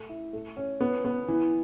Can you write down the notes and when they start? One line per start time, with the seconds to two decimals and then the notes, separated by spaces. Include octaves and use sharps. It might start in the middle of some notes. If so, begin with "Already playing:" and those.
Already playing: A3
0.09 E4
0.33 A3
0.57 C#4
0.81 B3
1.05 B3
1.28 E3